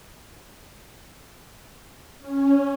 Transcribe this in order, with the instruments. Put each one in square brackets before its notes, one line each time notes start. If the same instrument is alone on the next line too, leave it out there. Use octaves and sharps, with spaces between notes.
[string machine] C#4